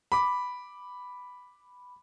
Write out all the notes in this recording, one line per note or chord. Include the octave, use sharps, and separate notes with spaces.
B5 D6